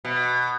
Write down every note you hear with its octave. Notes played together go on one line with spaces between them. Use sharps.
B2